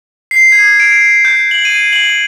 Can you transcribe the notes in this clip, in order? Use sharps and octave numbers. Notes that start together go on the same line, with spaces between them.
C7
G#6
D7
G6
F#7
D#7
F#7